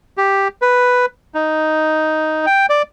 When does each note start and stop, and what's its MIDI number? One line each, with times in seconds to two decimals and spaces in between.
0.17 0.48 67
0.62 1.06 71
1.34 2.46 63
2.46 2.66 79
2.69 2.82 74